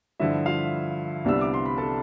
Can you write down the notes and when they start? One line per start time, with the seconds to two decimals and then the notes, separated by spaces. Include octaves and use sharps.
0.20 G2 D3 F3 E4 E5
0.46 F4 F5
1.25 C2 C3 G3 B3 D4 E6
1.41 D6
1.53 C6
1.66 B5
1.78 A4 A5